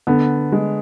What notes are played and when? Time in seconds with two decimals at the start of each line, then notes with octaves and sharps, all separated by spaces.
0.07 D3 B3
0.52 G#3